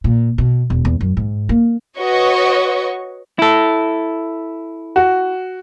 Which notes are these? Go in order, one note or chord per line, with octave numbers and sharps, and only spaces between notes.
A#2
B2
E1
E2
F#2
G#2
A#3
F#4 B4 C#5 D#5 C#6
E4 A4
F#4